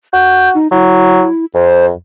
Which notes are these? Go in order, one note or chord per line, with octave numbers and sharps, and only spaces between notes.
F#4 G6
D#4
F#3 E4
F2 C5